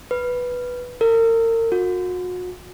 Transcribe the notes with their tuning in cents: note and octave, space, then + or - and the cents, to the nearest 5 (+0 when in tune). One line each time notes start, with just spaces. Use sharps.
B4 -5
A#4 -35
F#4 -35